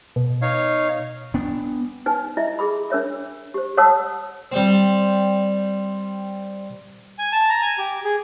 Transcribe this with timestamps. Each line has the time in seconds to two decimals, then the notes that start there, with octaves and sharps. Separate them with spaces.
0.16 B2
0.42 D#4 C#5 F5
1.34 B3 D4
2.06 D#4 B4 G#5
2.37 E4 D#5 E5
2.59 G#4 A4 B5
2.90 D4 A#4 C#5 E5
3.54 G4 C5
3.77 A4 C#5 F#5 A5 D#6 E6
4.52 G3 C4
7.19 G#5
7.32 A5
7.49 A#5
7.62 G#5
7.78 G4
8.05 G#4